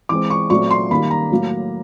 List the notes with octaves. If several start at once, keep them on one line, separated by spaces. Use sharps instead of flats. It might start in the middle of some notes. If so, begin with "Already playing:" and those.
E3 G#3 C4 D6
C#6
A#2 F#3 A3 C4 C#6
C6
D#3 G3 A#3 B5
A#5
A2 F#3 A#3